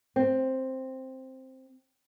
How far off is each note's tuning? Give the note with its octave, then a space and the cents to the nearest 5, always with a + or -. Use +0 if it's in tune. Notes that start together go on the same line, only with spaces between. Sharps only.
C4 +5